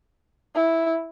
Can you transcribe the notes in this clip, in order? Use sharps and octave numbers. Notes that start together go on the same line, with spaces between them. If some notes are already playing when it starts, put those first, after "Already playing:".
E4